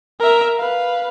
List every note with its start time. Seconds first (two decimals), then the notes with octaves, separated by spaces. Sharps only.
0.19 A#4 E5
0.57 B4 F5